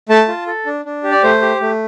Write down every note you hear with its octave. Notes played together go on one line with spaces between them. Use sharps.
A3 A5
F4
A4
D4
D4
G4
D5
A3 C5
G4
A3